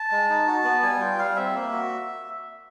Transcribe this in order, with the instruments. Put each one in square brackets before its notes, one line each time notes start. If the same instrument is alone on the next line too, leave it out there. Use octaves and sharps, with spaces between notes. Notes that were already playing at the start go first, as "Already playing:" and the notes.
Already playing: [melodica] A5
G#3
D#4
F#4
B3
G3 G#5
F4 G5
G3 F5
C4 E5
A#3
F#4